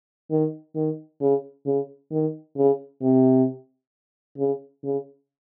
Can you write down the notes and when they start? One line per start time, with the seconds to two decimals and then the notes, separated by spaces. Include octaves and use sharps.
0.31 D#3
0.75 D#3
1.21 C#3
1.66 C#3
2.11 D#3
2.57 C#3
3.02 C3
4.38 C#3
4.83 C#3